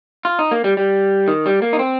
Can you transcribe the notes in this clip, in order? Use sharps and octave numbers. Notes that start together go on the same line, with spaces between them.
F4
D#4
A#3
G3
G3
D#3
G3
A#3
D#4
C4